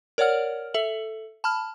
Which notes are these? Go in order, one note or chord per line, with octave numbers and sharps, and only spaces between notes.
A#4 C#5 D5 F#5 F6
A4 E5 F#7
A5 B5 F6